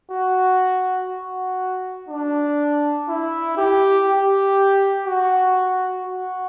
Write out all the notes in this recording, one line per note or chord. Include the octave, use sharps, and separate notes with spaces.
F#4
F#4
D4
E4
G4
G4
F#4
F#4